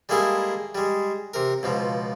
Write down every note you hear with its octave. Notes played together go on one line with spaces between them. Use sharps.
G3 G#3 A#3 E4 G#4 A4
G3 G#3
C3 A#4
C#2 B2 F3